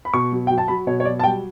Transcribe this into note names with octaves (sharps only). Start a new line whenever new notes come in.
B5
B2 C#6
F#3
F#3 G5
A5
F#3 B5
B2 C#5
C#5
F#3 D5
A5
G3 G5